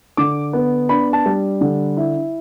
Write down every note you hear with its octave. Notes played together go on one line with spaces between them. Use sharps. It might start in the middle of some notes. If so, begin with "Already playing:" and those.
D3 D6
B3
D4 B5
A5
G3
D3
E4